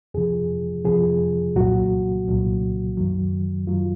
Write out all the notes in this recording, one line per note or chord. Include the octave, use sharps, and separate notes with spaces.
F2 C3 F3 G#4
F2 C3 F3 G#4
C2 A#2 F#3 F#4
C2 A#2 F#3
F#2 D#3 F#3
F#2 D#3 F#3 F4